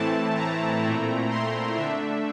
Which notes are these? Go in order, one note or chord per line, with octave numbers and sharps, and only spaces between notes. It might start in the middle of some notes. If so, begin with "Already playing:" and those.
Already playing: A2 E3 A3 C4 E4 A5
A#5
A#2 A3 C4 E4
C6
D3 A3 D4 E5